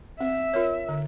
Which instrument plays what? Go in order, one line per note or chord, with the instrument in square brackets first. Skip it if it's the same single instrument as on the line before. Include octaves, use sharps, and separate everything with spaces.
[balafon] C4 [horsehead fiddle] E5
[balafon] F4 A#4 C#5
D3